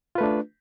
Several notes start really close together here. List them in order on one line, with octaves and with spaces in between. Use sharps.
F4 B4 A3 D4